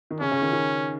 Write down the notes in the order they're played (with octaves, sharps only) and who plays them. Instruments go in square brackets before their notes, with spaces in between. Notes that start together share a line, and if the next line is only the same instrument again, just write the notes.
[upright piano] D#3
[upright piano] C#3 [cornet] C#4
[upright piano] C#3
D#3
D#3